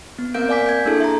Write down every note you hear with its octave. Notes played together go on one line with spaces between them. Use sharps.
B3
A#3 C4 A#4 F5 G6 D7
D5 F5 G#5 D6 B6
G6 G#6
A#3 D4 E4 G#4 A4
E5 A#5